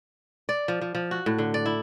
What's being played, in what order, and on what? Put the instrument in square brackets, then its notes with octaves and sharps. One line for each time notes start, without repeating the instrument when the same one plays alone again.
[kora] D5
F3
F3
F3
F#4
A2
D3
D5
E4